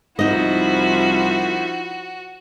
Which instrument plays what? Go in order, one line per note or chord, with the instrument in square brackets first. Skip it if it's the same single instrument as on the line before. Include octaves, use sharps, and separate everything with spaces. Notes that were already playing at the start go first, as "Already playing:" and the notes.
[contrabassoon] C2 [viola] F3 E4 [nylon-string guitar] D#4 D#5 [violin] F#4